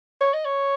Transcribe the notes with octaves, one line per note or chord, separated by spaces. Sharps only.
C#5
D#5
C#5